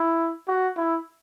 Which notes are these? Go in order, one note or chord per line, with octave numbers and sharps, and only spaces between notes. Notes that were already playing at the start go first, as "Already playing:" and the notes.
Already playing: E4
F#4
E4